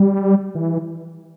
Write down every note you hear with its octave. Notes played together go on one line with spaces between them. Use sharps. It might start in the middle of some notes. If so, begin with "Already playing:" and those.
Already playing: G3
E3